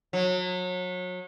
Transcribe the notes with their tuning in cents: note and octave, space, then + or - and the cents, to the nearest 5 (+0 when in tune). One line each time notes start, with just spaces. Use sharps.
F#3 -30